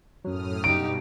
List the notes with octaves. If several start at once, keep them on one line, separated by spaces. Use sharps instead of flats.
F#2 A2 F#3 D#6 F6
G2 B2 D#4 G4 D7